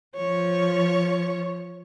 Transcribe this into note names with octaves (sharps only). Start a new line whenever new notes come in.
F3 C#5